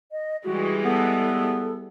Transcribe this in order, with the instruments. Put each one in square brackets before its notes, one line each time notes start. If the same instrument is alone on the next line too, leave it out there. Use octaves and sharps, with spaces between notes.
[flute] D#5
[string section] E3 G3 G#3 [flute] F#4
[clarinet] B3 [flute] A4